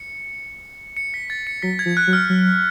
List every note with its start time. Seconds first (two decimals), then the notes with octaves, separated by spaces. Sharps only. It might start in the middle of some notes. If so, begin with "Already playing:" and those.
Already playing: C#7
0.97 C#7
1.14 B6
1.30 A6
1.47 C#7
1.62 F#3 B6
1.79 G#6
1.86 F3
1.97 F#6
2.07 F#3
2.13 F6
2.29 F#3